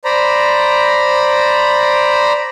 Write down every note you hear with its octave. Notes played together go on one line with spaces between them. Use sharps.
C5 D5 A#5 B5